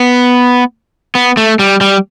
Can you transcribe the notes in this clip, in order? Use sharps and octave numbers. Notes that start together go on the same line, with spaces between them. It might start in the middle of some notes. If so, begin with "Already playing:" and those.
Already playing: B3
B3
A3
G3
G3